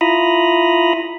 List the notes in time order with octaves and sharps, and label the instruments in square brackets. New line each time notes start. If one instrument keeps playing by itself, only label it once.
[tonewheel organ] E4 F4 A#5 B5 D#6